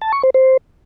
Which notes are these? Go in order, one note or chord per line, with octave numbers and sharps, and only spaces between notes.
A5
C#6
C5
C5